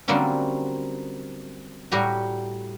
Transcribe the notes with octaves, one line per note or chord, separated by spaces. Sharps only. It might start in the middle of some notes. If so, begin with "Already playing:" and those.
D3 F#3 G3 A#3 C4 C#4
A2 G3 F#4 G4 G#5 A#5